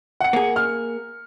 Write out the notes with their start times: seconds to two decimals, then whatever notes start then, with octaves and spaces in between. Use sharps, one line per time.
0.21 F#5 C#7
0.33 A#3 G#4
0.56 F6